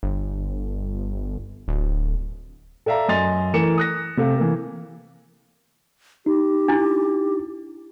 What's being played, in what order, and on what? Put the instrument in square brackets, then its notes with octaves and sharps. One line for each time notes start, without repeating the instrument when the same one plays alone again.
[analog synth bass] G1
D1
[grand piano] A4 D5 E5 F5 A#5
F#2 D#5 G#5 C6 A6 F7
E3 A3 A#4 C#7 E7
D#6 F#6 A#6
C3 A3 F5
E3 A#3
[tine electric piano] D#4 [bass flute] G4
[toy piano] D4 E4